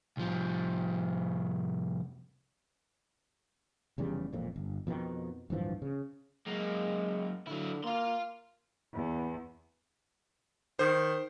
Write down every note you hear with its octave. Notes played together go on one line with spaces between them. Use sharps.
C2 F3
F1 E2 C#3 G3
E1 F2 A#2
G1
F2 B2 D3 D#3
D1 G2 E3 F3
C#3
F#2 G#3 A#3
D3 F#3 E4
A#3 F5 C6
E2
D#3 C5